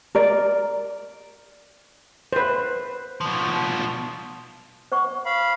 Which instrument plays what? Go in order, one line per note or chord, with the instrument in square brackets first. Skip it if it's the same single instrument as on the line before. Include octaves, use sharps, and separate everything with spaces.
[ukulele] A#4 D5
[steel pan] B4 C5
[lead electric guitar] B2 F3
[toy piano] C5 F#5 C#6
[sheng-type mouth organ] F5 B5